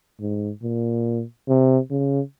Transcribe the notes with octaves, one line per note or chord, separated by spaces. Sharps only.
G#2
A#2
C3
C#3